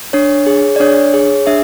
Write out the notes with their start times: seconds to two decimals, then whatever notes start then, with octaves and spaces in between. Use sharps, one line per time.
0.13 D4 C#5
0.46 G#4
0.76 D5
0.80 D4 C#5
1.14 G#4
1.47 D4 E5